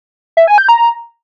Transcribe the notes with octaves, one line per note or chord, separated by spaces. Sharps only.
E5
G#5
G6
A#5